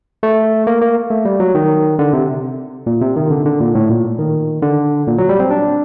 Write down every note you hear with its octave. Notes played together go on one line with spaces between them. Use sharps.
A3
A#3
A#3
A3
G3
F#3
D#3
D3
C3
A#2
C3
D#3
D3
D3
A#2
A2
A#2
D#3
D3
A#2
F#3
G3
C4
D4